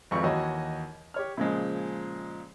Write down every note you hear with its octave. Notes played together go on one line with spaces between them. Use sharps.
G#1 F2 B4 C#6
D#2 E3 F#4 C#5 D#5
G4 C#5 F6
A#2 C#3 F3 G#3